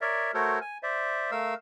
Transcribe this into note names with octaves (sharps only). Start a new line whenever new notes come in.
A#4 C#5 D5 E5
A3 F#4 A4 A#4 C5 C#5
G#5
C5 D5 E5
A3 A#4 F5 E6